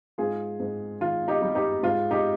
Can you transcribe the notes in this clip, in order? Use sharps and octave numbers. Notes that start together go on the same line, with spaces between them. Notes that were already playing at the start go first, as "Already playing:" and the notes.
G#2 F4 G#4
G#2
D#3 F4
D#4 G4
G3
D#4 G4
G#2 F4
D#4 G4